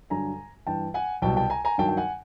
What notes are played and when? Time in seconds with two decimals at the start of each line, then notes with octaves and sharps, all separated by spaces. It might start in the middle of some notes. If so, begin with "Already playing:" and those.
0.10 G2 D3 F#3 G#5 A#5
0.67 G2 E3 G5 A5
0.94 F#5 G#5
1.22 C2 B2 F#3 G5 A5
1.37 G5 A5
1.50 G#5 A#5
1.65 G#5 A#5
1.78 G2 D#3 F#3 G5 A5
1.89 G5
1.97 F#5 G#5